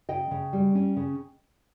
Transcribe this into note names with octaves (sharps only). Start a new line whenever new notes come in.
C#3 D#5 G5
C#3
G3
C#4
C#3